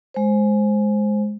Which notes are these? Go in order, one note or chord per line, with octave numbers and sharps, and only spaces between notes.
G#3 C5